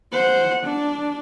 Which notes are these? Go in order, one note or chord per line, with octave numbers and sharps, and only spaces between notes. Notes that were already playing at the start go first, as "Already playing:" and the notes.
C5 F#5
D4